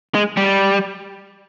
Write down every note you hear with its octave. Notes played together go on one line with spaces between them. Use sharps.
G#3
G3